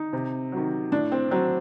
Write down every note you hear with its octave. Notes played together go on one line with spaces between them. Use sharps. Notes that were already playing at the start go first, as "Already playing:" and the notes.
Already playing: D#4
C3
D#3 F#3
A2 D4
C4
F#3 C4